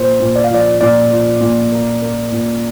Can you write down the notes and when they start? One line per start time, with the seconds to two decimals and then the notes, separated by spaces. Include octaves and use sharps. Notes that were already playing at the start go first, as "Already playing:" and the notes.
Already playing: A#2 C5
0.20 A#2
0.36 D5
0.44 F5
0.51 F3 D5
0.81 A#2 D5
1.11 F3
1.41 A#2
1.72 A#3
2.02 A#3
2.32 A#2